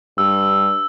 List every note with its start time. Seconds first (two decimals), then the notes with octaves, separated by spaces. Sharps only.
0.18 G2 E6